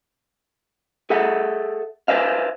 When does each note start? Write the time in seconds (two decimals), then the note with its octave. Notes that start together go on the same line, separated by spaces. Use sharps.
1.10 G#4 A4 E5 F#5
2.08 B4 C5 E5 F5